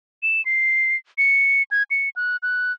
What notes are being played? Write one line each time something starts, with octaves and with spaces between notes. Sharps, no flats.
E7
C7
C#7
G#6
C#7
F#6
F#6